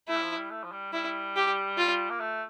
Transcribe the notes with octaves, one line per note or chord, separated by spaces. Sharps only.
A3 E4
G3
F3
G3
A3
F3
G3
G3 E4
G4
F4
A#3
A3